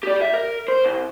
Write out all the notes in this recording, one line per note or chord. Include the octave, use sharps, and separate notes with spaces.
G4 D5
E5
A#4
C5
C2